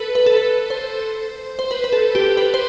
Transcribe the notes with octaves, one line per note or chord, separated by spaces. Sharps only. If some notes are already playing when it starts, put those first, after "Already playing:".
Already playing: A4 B4
B4
A4
B4
C5
C5
B4
B4
A4
G4
B4
C5